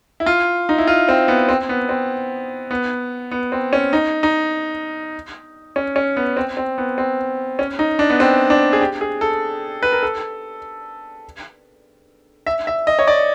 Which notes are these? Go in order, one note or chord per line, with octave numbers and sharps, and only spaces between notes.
E4
F4
D#4
E4
F4
C4
B3
C4
B3
C4
B3
B3
C4
C#4
D#4
D#4
C#4
C#4
B3
C4
C4
B3
C4
C#4
D#4
D4
B3
C4
D4
G#4
G4
G#4
A4
B4
A#4
A4
E5
E5
D#5
C#5
D5